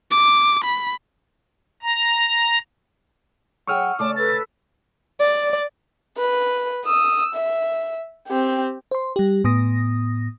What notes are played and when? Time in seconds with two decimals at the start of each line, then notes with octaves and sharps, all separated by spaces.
0.11 D6
0.64 B5
1.83 A#5
3.67 F#3 G#4 F#5 G5 C#6 E6 F6
3.99 C#3 A3 D5 A5 D6
4.16 A4 B4 A6
5.20 D5
6.18 B4
6.85 D#6 E6
7.35 E5
8.27 C4 G4
8.91 C5 C6
9.16 G3 G4
9.44 A2 B3 D#6 A#6